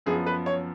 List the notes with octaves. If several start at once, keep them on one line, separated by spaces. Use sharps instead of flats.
F#2 F3 B3 G#4
B4
C#5